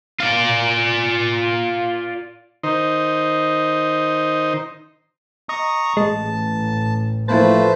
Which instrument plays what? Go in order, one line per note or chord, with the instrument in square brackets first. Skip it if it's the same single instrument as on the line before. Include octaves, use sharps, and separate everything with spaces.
[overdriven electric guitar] F4 D5
[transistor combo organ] D#3 D#4 C5
[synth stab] D#5 [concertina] A#5 C#6 D#6
[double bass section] A1 [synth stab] G#3 [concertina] A5
[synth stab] E3 A#3 A6 [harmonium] F3 A3 [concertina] B4 C5 A5